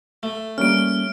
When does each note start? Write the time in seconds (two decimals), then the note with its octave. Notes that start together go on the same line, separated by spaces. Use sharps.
0.23 A3
0.58 G3 A#3 C#4 F6 D7